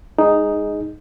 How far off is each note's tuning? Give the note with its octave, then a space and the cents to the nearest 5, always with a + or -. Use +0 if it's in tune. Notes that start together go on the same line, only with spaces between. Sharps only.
G#3 +0 D#4 +0 G#4 +0